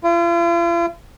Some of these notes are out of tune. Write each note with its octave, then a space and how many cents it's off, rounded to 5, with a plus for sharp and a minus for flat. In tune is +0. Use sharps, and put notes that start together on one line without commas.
F4 -45